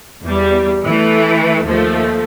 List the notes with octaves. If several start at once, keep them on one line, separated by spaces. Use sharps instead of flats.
E2 G3
E3 A3
D#2 F3 A3